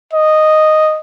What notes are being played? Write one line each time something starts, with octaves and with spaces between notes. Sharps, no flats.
D#5